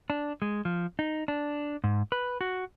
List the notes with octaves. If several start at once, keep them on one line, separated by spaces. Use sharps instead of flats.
D4
G#3
F3
D#4
D4
G#2
B4
F#4